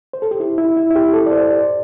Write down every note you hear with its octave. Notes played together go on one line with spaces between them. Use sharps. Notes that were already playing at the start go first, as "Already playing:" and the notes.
C5
A4
G4
E4
E4
E4
E4
G4
A4
D5
C5
D5